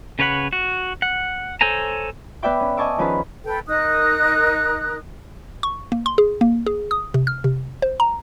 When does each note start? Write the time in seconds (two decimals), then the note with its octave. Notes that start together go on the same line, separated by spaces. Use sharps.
0.19 C#3 B4 C#5 F#5 B5
0.53 F#4
1.02 F#5
1.61 A4 C5 C#5 G#5 A#5
2.43 B3 B4 D5 E5 G5 D6
2.60 C#4
2.77 D#5 G#5 A5 C#6 D6 E6
2.98 D#3 F3 C#4 G#4 B4
3.44 A4 B4 G5
3.67 D#4 A#4 D#6 F#6
5.63 C#6
5.92 A#3
6.06 C6
6.18 G#4
6.41 A#3
6.66 G#4
6.91 D#6
7.14 C3
7.27 F6
7.44 C3
7.82 C5
8.00 A#5